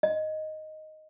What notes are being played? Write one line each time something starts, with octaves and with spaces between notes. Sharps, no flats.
D#5